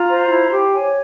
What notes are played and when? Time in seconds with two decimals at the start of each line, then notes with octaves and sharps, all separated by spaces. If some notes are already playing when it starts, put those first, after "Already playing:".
Already playing: F4 A#5
0.09 C5
0.30 E4
0.52 G4
0.74 C#5 G#5